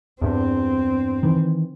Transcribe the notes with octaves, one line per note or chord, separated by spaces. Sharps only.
E2 G2 C4
D#3 E3